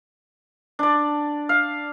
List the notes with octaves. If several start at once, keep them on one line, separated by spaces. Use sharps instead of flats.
D4 D5
F5